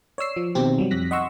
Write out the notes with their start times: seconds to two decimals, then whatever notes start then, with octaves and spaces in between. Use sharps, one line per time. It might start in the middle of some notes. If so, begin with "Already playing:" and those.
0.18 C#5 D5 E6 C7
0.36 F3
0.55 B2 D#3 C4 G4
0.78 F#3 G3
0.91 F2 F#6 A#6 B6
1.11 D#5 F#5 C6 C#6 E6